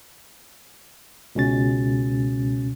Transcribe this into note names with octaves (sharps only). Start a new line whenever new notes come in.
C#2 B2 C#4 A6